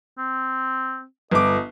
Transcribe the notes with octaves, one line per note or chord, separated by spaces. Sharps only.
C4
G1 D#5 D6